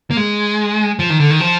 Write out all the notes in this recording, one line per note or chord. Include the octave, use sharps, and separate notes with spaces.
A#3
G#3
F3
D#3
D3
D#3
F3